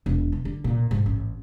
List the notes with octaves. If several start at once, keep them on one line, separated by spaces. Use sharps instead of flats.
E1
E3
D3
A#2
G#2
A1